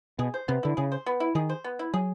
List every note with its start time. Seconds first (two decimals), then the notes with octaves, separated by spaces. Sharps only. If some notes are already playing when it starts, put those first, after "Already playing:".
0.19 B2 G#4
0.34 C5
0.48 C3 B3
0.63 D3 E4
0.77 C#3 G#4
0.92 C5
1.06 B3
1.20 E4
1.35 D#3 G#4
1.49 C5
1.64 B3
1.79 E4
1.94 F#3 G#4